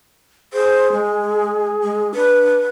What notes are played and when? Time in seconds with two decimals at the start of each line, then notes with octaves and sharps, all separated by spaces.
0.53 G#4 C5
0.92 G#3
1.83 G#3
2.15 D4 B4